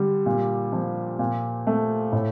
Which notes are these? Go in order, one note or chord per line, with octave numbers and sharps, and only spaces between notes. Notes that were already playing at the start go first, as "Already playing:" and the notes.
Already playing: D3 G3
A#2
F3
A#2
A3
A2